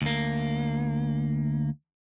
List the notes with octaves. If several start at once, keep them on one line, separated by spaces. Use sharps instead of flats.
D2 A#3